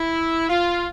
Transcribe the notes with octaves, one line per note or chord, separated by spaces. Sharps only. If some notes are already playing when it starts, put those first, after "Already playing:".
Already playing: E4
F4